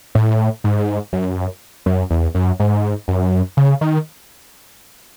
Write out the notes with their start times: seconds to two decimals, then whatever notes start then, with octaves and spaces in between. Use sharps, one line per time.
0.15 A2
0.64 G#2
1.13 F#2
1.86 F#2
2.10 E2
2.35 F#2
2.60 G#2
3.08 F#2
3.57 C#3
3.81 D#3